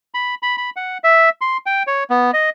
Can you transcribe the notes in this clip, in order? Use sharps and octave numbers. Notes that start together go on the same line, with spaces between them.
B5
B5
B5
F#5
E5
C6
G5
C#5
B3
D#5